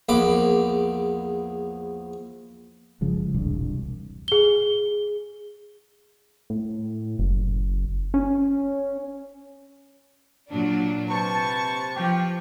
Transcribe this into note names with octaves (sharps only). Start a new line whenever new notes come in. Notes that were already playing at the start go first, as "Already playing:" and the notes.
A#1 E2 B5 D6
G1 C#3 F3 G#3
E1 C2 G2
G#4 G7
A2
F#1
C#4
A#2 F#3 D4
C3 B4 A5 C#6
F3 G4